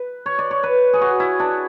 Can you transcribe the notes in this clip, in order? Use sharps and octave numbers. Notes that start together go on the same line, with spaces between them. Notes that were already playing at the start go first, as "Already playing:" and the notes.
Already playing: B4
C#5
D5
C#5
B4
G#4
F#4
E4
D4